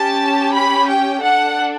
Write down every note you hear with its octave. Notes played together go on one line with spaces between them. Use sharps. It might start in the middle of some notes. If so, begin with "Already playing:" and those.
Already playing: C#4 G4 A5
B5
G5
D4 A4 F#5